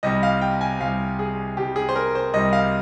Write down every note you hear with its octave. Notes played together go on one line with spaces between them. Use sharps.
C2 C3 G3 D#5
F5
G5
G#5
C2 C3 G3 F5
G#4
C2 C3 G3 G4
G#4
C5
A#4
C5
C2 C3 G3 D#5
F5